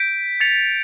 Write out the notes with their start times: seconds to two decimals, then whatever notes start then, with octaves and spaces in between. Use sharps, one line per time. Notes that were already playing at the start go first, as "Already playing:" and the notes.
Already playing: G6 B6 D7
0.40 A6 C#7 F7